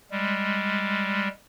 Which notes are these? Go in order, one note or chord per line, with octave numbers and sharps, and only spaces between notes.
G3 G#3